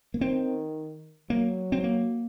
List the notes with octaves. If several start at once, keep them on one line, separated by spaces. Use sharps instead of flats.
A#3
D#3 C4
F#3 A#3
C4
A#3